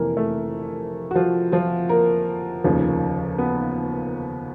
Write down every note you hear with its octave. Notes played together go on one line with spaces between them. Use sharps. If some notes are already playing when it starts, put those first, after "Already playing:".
Already playing: F1 F2 C3 E3 A#3 A#4
A3 A4
F#4
F3 F4
F3 F4
A#3 A#4
F1 D#2 C#3 F3
B3 B4